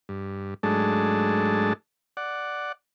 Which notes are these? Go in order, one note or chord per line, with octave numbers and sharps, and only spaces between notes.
G2
G#2 F#3 G#3 A3 D4 A5
D5 F#5